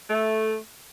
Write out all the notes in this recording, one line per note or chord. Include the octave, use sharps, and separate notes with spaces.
A3